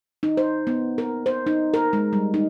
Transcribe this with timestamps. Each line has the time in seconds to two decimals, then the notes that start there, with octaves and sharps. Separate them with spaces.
0.23 D#4
0.37 C5
0.67 B3
0.98 A#4
1.26 C5
1.47 D#4
1.74 A#4
1.93 G#3
2.13 G3
2.34 D#4